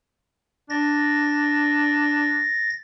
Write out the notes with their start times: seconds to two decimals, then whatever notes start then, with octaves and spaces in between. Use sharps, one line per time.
0.70 D4 A6 A#6